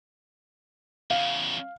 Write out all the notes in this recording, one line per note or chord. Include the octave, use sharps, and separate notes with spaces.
E2 C#3 F5